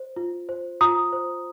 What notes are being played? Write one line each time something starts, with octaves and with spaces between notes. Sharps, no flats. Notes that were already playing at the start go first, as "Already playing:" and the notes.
Already playing: C5
F4
C5
F4 A#5 D#6
C5